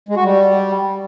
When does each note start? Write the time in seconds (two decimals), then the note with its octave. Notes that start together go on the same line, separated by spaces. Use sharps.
0.09 G#3
0.16 F#4
0.24 G3